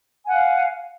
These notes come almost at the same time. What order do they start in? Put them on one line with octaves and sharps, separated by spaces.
G#5 F#5 F5